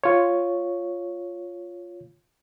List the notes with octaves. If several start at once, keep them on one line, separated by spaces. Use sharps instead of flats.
F4 C#5